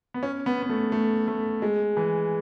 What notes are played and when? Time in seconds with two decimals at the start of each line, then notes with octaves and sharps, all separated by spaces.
0.14 B3
0.23 C#4
0.46 B3
0.62 B3
0.69 A3
0.92 A3
1.28 A3
1.62 G#3
1.97 E3